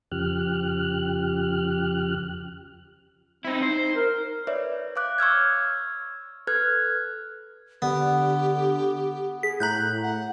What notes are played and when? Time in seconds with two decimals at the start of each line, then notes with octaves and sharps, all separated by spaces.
0.12 F2 C#3 F3 G4 F6 F#6
3.45 C4 D#4 E4
3.63 D#4 C5
3.96 A#4
4.47 B4 C#5 D5 E5
4.96 C#5 F5 D6 F#6
5.18 C#6 E6 F6 G#6
6.47 A4 B4 F6 F#6 G#6
7.82 D3 B3 G4
9.43 G#4 B6
9.60 A2 A#5 F#6 G6
10.03 F#5